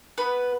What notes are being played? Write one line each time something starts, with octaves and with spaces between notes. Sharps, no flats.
B3 B4